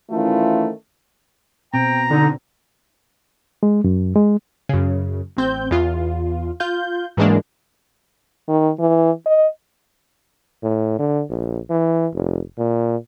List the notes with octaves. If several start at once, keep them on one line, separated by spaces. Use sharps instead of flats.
D#3 E3 A3 C#4 E4 F4
B2 C4 G5 A#5
D3 D#4
G#3
F#2
G#3
F#2 C#3
A1 C4 G6
E2 F4
F4 G6
G#2 E3 F#3 G#3 A#3 D4
D#3
E3
D#5
A2
D3
A#1
E3
F1
A#2